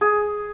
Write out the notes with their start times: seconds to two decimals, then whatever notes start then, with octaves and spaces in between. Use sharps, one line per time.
0.01 G#4